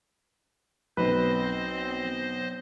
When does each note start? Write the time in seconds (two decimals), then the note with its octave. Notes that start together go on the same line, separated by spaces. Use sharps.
0.97 B1 C4 B4 C5 D#5